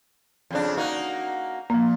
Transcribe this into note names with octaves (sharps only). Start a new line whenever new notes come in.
F2 C#3 D4
A#3 D#4 F#4
A#2 F3 A#3